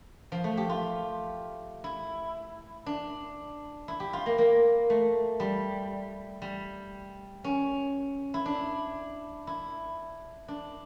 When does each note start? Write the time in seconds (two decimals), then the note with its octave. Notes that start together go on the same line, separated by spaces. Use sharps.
0.32 F3
0.44 A3
0.57 G4
0.69 F4
1.84 E4
2.86 D4
3.88 E4
4.00 G4
4.13 F4
4.26 A#3
4.38 A#3
4.90 A3
5.40 G3
6.42 G3
7.44 C#4
8.34 E4
8.46 D4
9.47 E4
10.48 D4